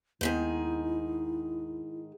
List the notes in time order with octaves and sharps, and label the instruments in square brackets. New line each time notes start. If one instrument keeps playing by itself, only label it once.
[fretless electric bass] D#2 B3 [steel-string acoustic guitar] G#2 D#3 G#4 [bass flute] E4